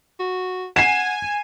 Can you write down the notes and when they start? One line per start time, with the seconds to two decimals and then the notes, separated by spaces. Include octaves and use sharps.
0.20 F#4
0.76 F#5 G#5 C7 E7